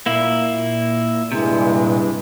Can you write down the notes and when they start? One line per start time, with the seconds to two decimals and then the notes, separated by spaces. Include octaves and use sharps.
0.06 A#2 A#3 E4
1.32 G2 C3 E3 G#3